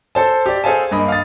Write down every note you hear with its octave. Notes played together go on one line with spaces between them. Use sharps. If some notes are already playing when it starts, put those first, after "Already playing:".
A4 C5 A5
G4 D5
G#4 A4 C5 F5 G#5 A5
G2 A#3 D#5 B5
F5 D#6 A6